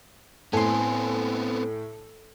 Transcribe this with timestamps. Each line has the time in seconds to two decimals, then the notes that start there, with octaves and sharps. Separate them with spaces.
0.53 A2 B3 C4 A4 G#5 C6